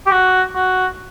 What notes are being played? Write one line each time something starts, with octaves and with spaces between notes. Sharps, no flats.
G4
F#4
F#4